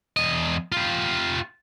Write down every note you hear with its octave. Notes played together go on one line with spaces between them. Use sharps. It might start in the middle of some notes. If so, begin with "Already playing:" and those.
E2 D#5
F4 G4